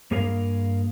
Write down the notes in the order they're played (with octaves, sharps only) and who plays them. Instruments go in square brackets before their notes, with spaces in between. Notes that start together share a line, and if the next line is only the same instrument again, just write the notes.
[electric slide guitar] G2 A#3 G#4 A#4 F5